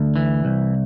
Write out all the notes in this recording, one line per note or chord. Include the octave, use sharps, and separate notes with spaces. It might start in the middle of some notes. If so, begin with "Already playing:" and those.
Already playing: D2
E3
C2